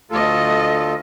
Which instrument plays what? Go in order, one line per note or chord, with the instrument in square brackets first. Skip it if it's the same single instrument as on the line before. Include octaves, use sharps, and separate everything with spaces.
[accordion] D2 F4 A4 [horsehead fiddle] A3 D#5